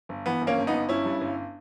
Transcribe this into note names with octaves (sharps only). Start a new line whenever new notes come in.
G1
E3 B3
G1
A#3 C#4
G1
B3 D#4
G1
G1 C#4 E4
G2
G1